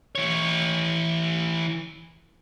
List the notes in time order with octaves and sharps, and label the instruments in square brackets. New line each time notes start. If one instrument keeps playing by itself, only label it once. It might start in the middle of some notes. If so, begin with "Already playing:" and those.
[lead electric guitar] E3 C#5